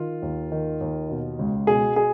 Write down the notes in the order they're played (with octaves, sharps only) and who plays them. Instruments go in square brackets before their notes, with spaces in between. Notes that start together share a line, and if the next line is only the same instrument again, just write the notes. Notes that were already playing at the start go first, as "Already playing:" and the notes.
Already playing: [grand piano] D#3 F4
D#2
D#3
D#2
B2
C#2
B2 G#4
G#4